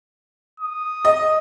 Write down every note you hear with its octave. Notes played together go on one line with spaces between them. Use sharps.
D#6
D#5